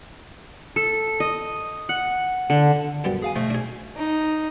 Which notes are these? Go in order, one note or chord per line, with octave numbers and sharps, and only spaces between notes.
A4
D#5
F#5
D3
F#2 G3 B3
G#4 F5 G#5
B2 F3 A3
D4 G#4
D#4